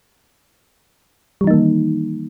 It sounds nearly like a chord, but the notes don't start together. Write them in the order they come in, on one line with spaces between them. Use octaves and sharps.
G3 E3 D#4 A#3 D#3